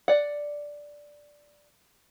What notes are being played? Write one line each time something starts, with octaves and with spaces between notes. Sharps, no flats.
D5 F#5